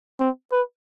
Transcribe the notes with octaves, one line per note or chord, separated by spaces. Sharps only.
C4
B4